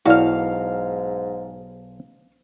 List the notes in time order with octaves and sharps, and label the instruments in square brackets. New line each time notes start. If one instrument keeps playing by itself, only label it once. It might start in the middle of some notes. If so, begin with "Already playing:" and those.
[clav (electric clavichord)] B1 F#4 [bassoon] G#2 [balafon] E4 D5 [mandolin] F5 F6